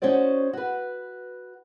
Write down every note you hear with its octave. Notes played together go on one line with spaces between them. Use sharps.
C#4 D#4 F#4 C5 D5
F#4 B4